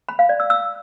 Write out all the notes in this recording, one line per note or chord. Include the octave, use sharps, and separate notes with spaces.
B5
F5
D5
E6
E6